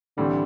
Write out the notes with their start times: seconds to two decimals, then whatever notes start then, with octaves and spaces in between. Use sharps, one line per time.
0.17 A2 D3 E3 G3 C4